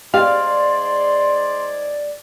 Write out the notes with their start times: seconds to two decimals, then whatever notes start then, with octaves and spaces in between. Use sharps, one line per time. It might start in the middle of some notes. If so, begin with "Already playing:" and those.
0.14 G#2 G4 G#4 D5 F5 C6